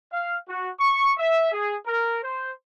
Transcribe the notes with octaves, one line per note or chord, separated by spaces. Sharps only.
F5
F#4
C#6
E5
G#4
A#4
C5